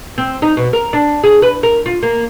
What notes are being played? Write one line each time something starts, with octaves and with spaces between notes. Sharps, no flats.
C4
D#4
B2
A#4
D4
G#4
B4
A#4
F4
A#3